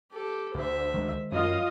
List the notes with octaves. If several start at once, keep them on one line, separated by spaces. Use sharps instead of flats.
G4 A4
D2 C5 E5
D#3 G#3
F#2 F4 D#5 F5 D#6